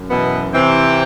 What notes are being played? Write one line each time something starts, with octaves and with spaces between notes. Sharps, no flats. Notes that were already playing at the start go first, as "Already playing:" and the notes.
Already playing: F#2
B2 E3 B3
C3 E3 C4